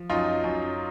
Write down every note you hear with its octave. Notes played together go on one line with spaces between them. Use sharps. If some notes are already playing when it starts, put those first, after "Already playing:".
Already playing: F3
F#2 D#4 F4
F#2